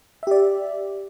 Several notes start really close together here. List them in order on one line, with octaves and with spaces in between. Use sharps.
E5 G4 D5